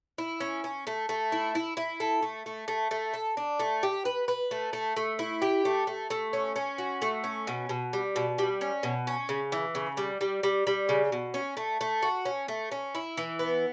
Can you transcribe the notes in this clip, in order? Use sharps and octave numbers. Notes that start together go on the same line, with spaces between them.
E4
C#4
C#4
A3
A3
E4
E4
E4
A4
A3
A3
A3
A3
A4
D4
A3
G4
B4
B4
A3
A3
A3
E4
G4
A3
A3
A3
C#4
C#4
F#4
A3
C#4
B2
B2
G3
B2
G3
C#4
B2
C#4
C#3
E3
C#3
G3
G3
G3
G3
C#3
B2
C#4
A3
A3
F#4
C#4
A3
C#4
E4
E3
B3